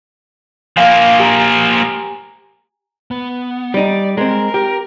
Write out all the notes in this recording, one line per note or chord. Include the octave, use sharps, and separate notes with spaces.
F3 A#3 F5 G#5
G4 G#5 A#5
B3
G3 D#4 D5
G#3 C4 A#4
G4